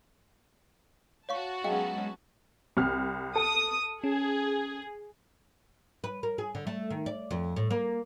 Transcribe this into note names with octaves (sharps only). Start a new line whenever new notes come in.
F#4 C#5 F5 A5 C#6
F#3 G#3 B3 C#4 F5 G5
C2 F6
A4 D#6
C#4 G#4
B4
A#4
G#4
D3
A3
D#3
D5
F2
A2
A#3